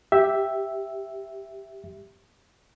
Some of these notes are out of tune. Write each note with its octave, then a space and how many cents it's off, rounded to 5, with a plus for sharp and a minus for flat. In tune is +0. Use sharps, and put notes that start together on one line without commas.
G4 +0 E5 +0